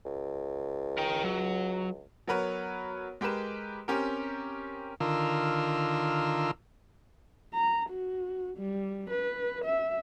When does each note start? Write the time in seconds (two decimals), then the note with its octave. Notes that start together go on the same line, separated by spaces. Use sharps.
0.05 C#2
0.98 A#4 G5
1.24 F#3
2.27 F#3 B3 A#4 B4 C#5
3.21 G#3 G4 A#4 B4 E7
3.88 C4 C#4 G4 A#4
5.00 D3 D#3 F4 A#4 E6
7.54 A#5
7.90 F#4
8.57 G3
9.10 B4
9.64 E5